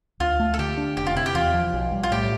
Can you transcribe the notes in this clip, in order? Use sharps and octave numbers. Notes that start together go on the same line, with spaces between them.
D2 F4
A3
A4
D3 G4
D4
F1 G4
F4
C3 E4
G4
E2 F4
F3
B1
G3
F4
A2 G4